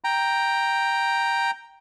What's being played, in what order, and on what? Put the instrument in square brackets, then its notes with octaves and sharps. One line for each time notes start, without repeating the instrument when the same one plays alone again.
[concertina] G5 A#5